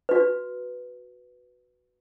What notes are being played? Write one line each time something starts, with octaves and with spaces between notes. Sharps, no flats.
F#4 B4